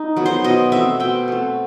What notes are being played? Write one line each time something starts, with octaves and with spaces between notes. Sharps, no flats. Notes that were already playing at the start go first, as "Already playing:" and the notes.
Already playing: D#4
F#3 B3
C5
B2 D#5
A3 C4 E5
B2 G5
A3 C4